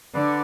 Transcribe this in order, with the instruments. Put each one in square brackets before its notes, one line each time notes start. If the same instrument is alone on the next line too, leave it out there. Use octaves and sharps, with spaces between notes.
[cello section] D3 [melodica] B4 D5